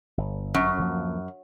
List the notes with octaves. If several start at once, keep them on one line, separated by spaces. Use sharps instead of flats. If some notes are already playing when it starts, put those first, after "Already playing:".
G1
G1 F#2 C#4
D2 F3 A#3